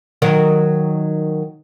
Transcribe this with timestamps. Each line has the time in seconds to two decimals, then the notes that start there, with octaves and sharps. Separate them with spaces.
0.22 D#3 F#3 A#4